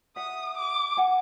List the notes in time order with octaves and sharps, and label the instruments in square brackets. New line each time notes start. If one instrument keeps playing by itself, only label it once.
[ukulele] E5 F#5 [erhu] D#6
[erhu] D6
[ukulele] F#5 G#5